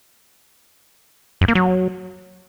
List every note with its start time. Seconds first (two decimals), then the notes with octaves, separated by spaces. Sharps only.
1.41 F#2
1.48 A#3
1.55 F#3